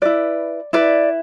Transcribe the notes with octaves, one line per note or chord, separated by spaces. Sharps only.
E4 B4 D5
E4 B4 D5